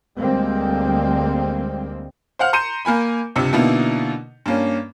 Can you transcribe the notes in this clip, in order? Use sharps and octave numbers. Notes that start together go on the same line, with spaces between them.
D2 G3 G#3 A#3 C4
C5 F5 F#5 F6
A#5 C6 G6 C#7 D#7 E7
A#3 A#4 G#5 B5
C#2 G2 C3 E6 C#7
B2 D3 A#3 B3 D#4 E4
G2 A#3 C#4